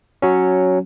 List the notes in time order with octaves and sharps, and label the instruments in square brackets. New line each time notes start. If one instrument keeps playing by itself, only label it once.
[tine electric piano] F#3 C#4